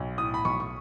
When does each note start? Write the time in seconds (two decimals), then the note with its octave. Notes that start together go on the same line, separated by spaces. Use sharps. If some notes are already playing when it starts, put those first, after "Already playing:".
Already playing: B1
0.18 A2 D#6
0.34 B5
0.45 B1 C#6
0.60 C#6